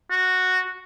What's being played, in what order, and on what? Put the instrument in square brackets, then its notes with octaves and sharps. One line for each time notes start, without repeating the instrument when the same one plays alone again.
[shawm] F#4